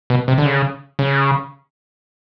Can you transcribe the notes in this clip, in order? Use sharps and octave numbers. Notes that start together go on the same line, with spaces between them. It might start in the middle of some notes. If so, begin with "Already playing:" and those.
B2
C3
D3
C#3
C#3